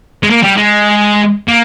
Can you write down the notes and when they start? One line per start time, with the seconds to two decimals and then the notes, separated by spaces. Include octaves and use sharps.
0.23 G#3
0.30 A#3
0.43 G3
0.57 G#3
1.48 A#3